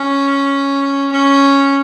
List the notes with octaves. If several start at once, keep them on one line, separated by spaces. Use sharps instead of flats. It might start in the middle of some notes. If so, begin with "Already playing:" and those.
Already playing: C#4
C#4